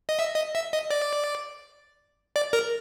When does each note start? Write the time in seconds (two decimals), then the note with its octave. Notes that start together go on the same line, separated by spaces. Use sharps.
0.09 D#5
0.19 E5
0.36 D#5
0.55 E5
0.73 D#5
0.91 D5
2.36 D5
2.53 A#4